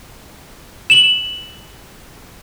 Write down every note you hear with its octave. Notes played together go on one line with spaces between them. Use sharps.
E7 F#7